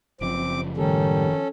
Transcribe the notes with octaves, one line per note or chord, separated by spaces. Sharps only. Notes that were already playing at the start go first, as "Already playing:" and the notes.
F#1 C#3 F3 C4 D6
A2 D#3 G3 C#4 A4